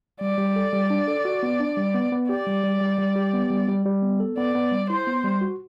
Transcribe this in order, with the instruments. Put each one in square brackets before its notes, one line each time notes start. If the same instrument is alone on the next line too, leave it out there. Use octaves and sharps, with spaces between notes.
[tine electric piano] G3 [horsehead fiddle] D5
[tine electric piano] G3
A4
G3
D4
A4
F#4
B3
D4
G3
B3
B3
[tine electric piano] G4 [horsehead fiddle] D5
[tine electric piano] G3
G3
G3
G3
G4
B3
G3
G3
G3
B3
A4
[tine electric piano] B3 [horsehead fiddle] D5
[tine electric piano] B3
G3
[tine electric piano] E4 [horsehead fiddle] C5
[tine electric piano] B3
G3
F#4